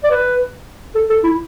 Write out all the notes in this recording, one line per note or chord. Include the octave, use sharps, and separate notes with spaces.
D5
B4
A4
A4
E4